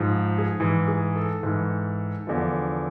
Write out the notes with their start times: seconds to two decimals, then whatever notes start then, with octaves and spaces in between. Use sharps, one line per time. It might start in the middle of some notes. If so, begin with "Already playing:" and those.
Already playing: G#2 F3
0.38 G#4
0.60 G#2 E3
0.88 G#4
1.16 A4
1.43 G#2 E3
2.27 E2 D3 F3